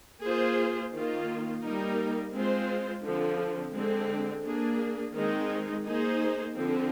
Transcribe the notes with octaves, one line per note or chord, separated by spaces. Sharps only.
A#3 F4 G#4 C5
D#3 A#3 F4
G3 A#3 D#4 A#4
G#3 C4 F4 C5
D3 F3 C4
D3 G#3 C4
A#3 D4 G#4
D#3 G#3 C4 D#4
A#3 D#4 G#4 C5
D3 F3 C4